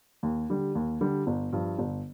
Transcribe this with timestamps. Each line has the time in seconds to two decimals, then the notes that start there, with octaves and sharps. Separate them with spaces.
0.23 D#2
0.50 D3 G3
0.75 D#2
1.01 D3 G3
1.27 G1
1.53 G2 F3
1.78 G1